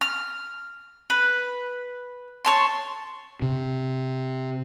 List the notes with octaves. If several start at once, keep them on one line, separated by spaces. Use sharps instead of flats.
F6
B4
C#5 A5 C6
C3